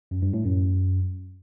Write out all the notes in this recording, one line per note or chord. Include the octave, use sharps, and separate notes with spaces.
F#2
G2
A2
F#2